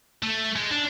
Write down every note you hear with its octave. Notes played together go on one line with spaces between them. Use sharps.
A3
G#3
D4